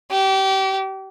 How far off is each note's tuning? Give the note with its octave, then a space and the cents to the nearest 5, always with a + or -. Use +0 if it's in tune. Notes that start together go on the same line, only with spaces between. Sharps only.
G4 -30